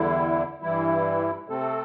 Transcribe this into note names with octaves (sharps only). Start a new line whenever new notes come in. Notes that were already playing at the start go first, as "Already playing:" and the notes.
Already playing: E2 D3 G3 E4
G2 E3 G3 E4
C3 A3 C4 A4